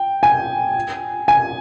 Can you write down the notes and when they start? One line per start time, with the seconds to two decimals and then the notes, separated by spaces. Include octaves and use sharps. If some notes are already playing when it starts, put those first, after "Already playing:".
Already playing: G5
0.23 G#5
1.28 G#5